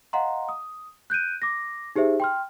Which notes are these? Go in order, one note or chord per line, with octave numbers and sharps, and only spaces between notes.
D#5 F5 F#5 A#5 C6
D#6
F#6 G6 D7 D#7
D6 A#6
D#4 G4 G#4 C5 E5
G5 C6 F6